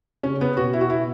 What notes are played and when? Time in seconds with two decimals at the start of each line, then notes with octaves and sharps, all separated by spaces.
0.23 C#3 C#4
0.41 B3
0.57 B2 F#4
0.73 E4
0.81 F#4
0.90 E4